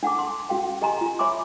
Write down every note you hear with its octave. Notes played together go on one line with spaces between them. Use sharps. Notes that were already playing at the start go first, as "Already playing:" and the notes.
D4 F#5 A5 D6
C6
C#4 F#4 F5 G5
G4 D#5 G#5 A#5 C6
F4
C#5 E5 G#5 B5 C6 D6